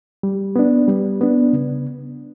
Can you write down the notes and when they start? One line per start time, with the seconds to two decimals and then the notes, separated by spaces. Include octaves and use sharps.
0.23 G3
0.56 B3 D4
0.88 G3
1.21 B3 D4
1.53 C#3